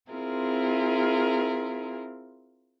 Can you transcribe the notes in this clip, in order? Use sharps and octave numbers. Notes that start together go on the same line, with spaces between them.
C4 E4 F4 G#4 A#4